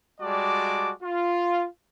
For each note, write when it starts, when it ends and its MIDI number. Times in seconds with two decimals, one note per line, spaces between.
0.21 0.92 55
0.21 0.92 56
0.21 0.92 66
0.21 0.92 74
0.21 0.92 81
0.21 0.92 86
1.02 1.66 65